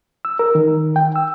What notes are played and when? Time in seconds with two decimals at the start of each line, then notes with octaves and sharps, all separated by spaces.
0.25 E6
0.39 A#4
0.55 D#3
0.96 G5
1.16 E6